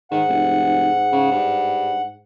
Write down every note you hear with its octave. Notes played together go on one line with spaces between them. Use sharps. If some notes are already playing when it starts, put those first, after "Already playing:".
G#2 D#3 F#5
F1
C#3
G2